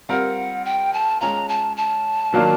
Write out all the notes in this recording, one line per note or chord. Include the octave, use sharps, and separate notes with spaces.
G3 C4 F4 A#4 F#5
G5
A5
G#3 C#4 F4 A#5
A5
A5
D#3 F#3 A#3 D4 F4